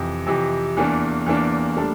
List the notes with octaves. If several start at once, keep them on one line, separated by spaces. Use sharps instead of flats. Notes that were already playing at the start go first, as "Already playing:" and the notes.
Already playing: F2 C3 E3
F2 C3 E3
E2 E3 A#3 D4
E2 E3 A#3 D4
A2 G3 A#3 D4 A4